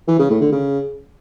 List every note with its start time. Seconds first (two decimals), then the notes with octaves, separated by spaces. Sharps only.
0.08 E3
0.19 C#3
0.30 A2
0.41 D3
0.52 C#3